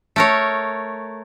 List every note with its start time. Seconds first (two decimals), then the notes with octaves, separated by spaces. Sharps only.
0.16 A3 A#4 C#5